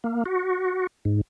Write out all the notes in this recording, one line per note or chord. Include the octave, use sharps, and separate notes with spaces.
A#3
F#4
G#2